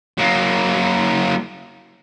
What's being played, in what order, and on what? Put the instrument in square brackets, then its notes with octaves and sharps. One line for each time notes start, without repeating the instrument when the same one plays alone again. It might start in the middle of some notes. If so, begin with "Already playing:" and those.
[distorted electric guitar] F#3 A#3